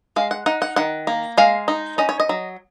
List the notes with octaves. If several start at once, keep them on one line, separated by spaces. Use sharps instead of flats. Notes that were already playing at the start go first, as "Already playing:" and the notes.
G#3 F5
F#5
D#4 F#5
F#5
D#3 F#5
A#3
G#3 F5
D#4
C#4 D#5
C#5
D#5
F#3